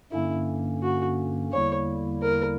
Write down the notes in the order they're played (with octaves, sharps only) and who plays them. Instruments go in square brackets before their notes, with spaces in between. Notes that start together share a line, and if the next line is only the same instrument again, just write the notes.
[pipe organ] G2 D3 A#3 C#4 [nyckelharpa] E4
[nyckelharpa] F#4
[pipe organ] E2 D3 G3 A#3 E4 [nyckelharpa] C#5
[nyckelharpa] A#4